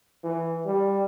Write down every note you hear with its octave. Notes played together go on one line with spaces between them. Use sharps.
E3
G3